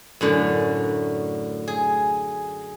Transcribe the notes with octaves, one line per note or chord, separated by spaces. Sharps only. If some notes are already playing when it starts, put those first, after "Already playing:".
F#2 A2 D3
G#4